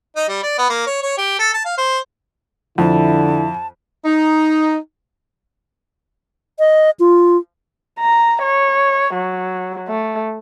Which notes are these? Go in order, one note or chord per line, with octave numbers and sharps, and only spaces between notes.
D#4
G3
D5
B3
A#3
C#5
C#5
G4
A4
A5
F5
C5
F2 D3 E4 A5
D#4
D#5
F4
A#5
C#5
F#3
A3